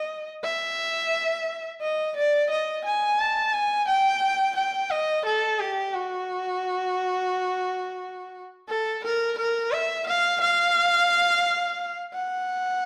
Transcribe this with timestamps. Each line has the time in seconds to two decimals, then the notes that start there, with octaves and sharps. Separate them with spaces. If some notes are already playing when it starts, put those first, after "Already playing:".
Already playing: D#5
0.43 E5
1.82 D#5
2.16 D5
2.50 D#5
2.85 G#5
3.19 A5
3.53 G#5
3.88 G5
4.56 G5
4.90 D#5
5.26 A4
5.59 G4
5.94 F#4
8.68 A4
9.04 A#4
9.38 A#4
9.72 E5
10.07 F5
10.41 F5
12.13 F#5